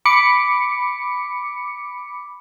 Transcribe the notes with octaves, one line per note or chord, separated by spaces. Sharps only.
B5 D6 C#7